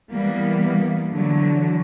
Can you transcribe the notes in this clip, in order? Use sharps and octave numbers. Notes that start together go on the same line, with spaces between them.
E3 G3 A#3 B3
D3 E3 F#3